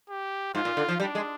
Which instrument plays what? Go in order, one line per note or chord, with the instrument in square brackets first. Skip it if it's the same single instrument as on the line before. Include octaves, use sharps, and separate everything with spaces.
[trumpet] G4
[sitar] G#2 [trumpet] F4
[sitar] A#2
D3
F3
[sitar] G3 [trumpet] D4
[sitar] G#3